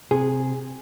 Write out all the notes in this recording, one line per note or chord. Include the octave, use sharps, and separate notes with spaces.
C3 G#4